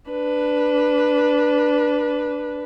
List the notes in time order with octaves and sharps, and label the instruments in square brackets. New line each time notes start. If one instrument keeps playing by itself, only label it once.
[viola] D4 B4